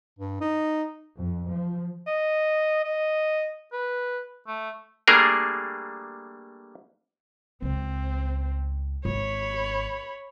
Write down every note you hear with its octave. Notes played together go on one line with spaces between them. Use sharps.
G2
D#4
F2
F3
D#5
D#5
B4
A3
G3 A3 A#3 D4 G#4 A#4
C#2 C4
G#1 C#5 B5